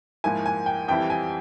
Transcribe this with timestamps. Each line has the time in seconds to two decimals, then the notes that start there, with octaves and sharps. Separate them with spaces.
0.24 G#2 F3 A#3 E4 G#5
0.46 G#5
0.66 G5
0.88 F2 E3 G3 C4 E4 G5
1.10 G#5